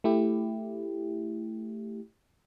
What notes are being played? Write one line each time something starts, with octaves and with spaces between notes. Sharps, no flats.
A3 E4 G4